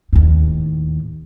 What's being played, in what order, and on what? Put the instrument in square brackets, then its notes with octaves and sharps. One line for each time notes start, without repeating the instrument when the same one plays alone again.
[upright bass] D#2 A2